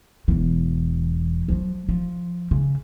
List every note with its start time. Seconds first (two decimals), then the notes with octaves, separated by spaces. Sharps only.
0.28 E1 E3
1.48 F3 F#3
1.89 F3
2.51 C#3